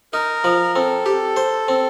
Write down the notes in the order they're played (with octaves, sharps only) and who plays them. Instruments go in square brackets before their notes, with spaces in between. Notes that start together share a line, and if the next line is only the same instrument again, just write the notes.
[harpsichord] D#4 [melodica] A#4
[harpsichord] F3
[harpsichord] C4 [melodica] A4
[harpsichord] G4
C5
C4